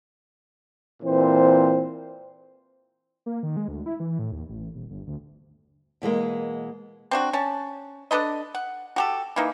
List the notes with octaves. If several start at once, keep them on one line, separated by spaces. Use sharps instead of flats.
A#2 E3 C4 C5
A#3
D#3
G#3
D2
E4
E3
A2
D#2
A1
D#1
G1
D2
B2 E3 G#3 A#3
C4 D4 F#4
C#4 A5
D4 A4 B4 D#5
F#5
F#4 G4 A4
E3 A#3 D#4